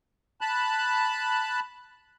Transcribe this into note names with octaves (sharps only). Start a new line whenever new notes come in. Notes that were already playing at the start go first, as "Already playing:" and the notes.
A5 B5 F#6